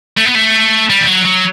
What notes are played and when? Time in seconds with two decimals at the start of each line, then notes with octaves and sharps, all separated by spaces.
0.17 A3
0.25 B3
0.35 A3
0.90 G3
1.01 E3
1.07 F#3
1.25 F#3